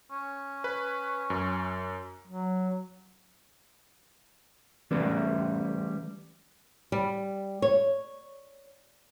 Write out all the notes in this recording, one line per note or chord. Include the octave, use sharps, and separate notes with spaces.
C#4
B4
F#2
F#3
E3 G3 A3 C#4 B4 D5
G3
C#5